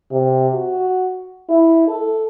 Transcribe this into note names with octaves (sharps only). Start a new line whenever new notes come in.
C3
F#4
E4
A4